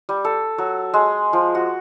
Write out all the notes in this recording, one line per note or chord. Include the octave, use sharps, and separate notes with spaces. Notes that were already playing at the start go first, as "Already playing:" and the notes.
G3
A4
F#3
G#3
F3
F#4